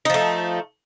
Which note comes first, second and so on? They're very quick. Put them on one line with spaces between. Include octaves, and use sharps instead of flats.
D#4 F3 A3